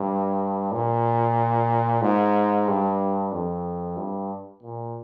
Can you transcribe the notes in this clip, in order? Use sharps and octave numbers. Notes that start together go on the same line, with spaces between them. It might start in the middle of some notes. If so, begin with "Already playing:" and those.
Already playing: G2
A#2
G#2
G2
F2
G2
A#2